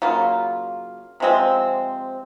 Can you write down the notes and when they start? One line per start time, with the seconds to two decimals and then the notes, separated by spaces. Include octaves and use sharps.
0.02 C#3 F#3 A#3 F4
1.20 C3 F3 G#3 C4